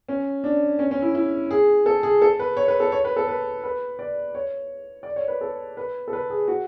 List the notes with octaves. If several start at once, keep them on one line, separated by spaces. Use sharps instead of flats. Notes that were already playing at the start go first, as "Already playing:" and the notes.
C#4
D4
C#4
C#4
E4
E4
G#4
A4
G#4
A4
B4
C#5
B4
A4
C#5
B4
A4
B4
B4
D5
C#5
D5
C#5
B4
A4
B4
A4
B4
G#4
F#4